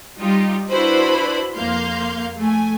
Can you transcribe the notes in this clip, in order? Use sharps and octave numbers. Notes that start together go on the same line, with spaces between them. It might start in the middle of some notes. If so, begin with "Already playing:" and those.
G3 D#4 F4 G4
D4 E4 F#4 B4 C5 B5
F2 A#3 F5 C6 G6
A3 G#5